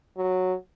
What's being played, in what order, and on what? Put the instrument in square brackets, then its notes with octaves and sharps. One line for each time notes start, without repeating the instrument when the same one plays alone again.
[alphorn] F#3